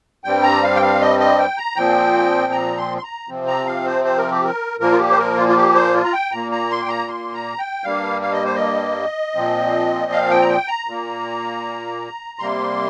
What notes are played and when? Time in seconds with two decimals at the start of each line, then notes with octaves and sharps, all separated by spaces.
0.24 G2 G3 C4 G5
0.43 A#5
0.63 F5
0.76 G5
0.82 F5
1.01 D#5
1.20 D#5
1.38 G5
1.58 A#5
1.76 A#2 F3 C4 G5
2.52 A#5
2.77 C6
2.97 C6
3.03 A#5
3.29 C3 F3 C4
3.47 A#5
3.66 F5
3.86 C5
4.05 C5
4.17 A#4
4.31 G4
4.45 A#4
4.80 A#2 F3 A#3 A#4
4.92 F4
4.99 G4
5.12 C5
5.18 A#4
5.37 F4
5.48 F4
5.56 G4
5.75 C5
5.94 F4
6.04 A#5
6.13 G5
6.32 A#2 A#3 A#5
6.52 A#5
6.71 C6
6.83 G5
6.89 A#5
7.08 C6
7.34 A#5
7.58 G5
7.84 G2 G3 A#3 F5
8.22 F5
8.32 D#5
8.45 C5
8.55 D#5
9.35 A#2 F3 C4
10.12 F5
10.31 G5
10.42 A#5
10.49 G5
10.68 A#5
10.87 A#2 A#3
12.39 C3 G3 A#3 C6